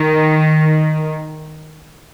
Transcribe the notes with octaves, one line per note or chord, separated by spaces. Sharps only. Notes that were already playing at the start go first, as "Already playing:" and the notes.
Already playing: D#3